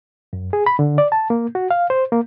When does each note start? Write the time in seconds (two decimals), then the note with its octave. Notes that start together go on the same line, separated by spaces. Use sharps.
0.33 F#2
0.53 G#4
0.66 B5
0.79 D3
0.98 D5
1.12 A5
1.30 A#3
1.55 F#4
1.71 F5
1.90 C5
2.12 A#3